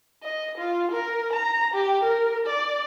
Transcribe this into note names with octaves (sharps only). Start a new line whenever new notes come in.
D#5
F4
A#4
A#5
G4
A#4
D5